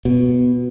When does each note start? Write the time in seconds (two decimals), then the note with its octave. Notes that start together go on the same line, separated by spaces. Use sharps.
0.05 B2